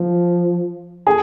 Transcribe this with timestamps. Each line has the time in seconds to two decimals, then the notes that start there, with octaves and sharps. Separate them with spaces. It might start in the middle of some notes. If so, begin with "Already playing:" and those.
Already playing: F3
1.07 G#4